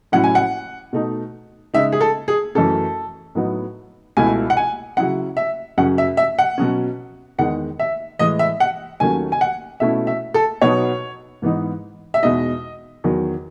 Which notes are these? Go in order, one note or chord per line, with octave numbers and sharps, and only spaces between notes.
A2 F#3 C#4 E4 F#5
G#5
F#5
B2 A3 D#4
C#3 G#3 D#4 E5
G#4
A4
G#4
F#2 E3 A3 C#4 A4
A2 F#3 B3 D#4
C#2 B2 A3 E4 G#5
F#5
G#5
C#3 F#3 C#4 E4 F#5
E5
F#2 C#3 F#3 C#4 F#5
E5
E5
F#5
B2 F#3 C#4
E2 D#3 G#3 D#4 F#5
E5
A2 E3 G#3 D#5
E5
F#5
D#2 D#3 F#3 A3 C#4 G#5
G#5
F#5
B2 A3 C#4 E4 E5
E5
A4
B2 F#3 B3 D#4 C#5
G#2 E3 B3 D#4
E5
E2 B2 G#3 D#4 D#5
E2 D#3 F#3